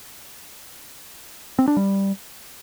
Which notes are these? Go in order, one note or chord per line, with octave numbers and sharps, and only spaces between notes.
C4
D4
G3